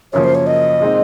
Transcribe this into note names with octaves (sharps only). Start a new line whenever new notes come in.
F#2 C#3 F3 A#3 C#5
C5
C#5
D#5
A#2 G#3 C4 D#4